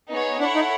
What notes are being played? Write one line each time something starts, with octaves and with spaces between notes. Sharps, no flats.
B3 D#4 G#4 C#5
D4 E4 A4 C#5 F#5
D#4